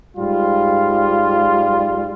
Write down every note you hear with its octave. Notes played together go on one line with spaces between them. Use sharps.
G#2 G3 F4